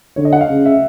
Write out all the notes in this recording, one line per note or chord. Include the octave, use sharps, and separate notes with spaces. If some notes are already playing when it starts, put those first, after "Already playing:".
D3 C#5
D#5
F#5
F5
C#3
E5